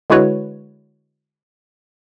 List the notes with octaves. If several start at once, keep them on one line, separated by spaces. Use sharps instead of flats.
D3 G#3 E4 F#4 B4 C#5